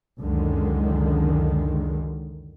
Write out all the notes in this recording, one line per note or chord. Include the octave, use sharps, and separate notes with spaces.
C#2 F#2 D3 D#3 G#3